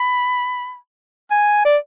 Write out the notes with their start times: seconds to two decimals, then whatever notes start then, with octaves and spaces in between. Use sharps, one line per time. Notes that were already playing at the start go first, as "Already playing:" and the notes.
Already playing: B5
1.31 G#5
1.65 D5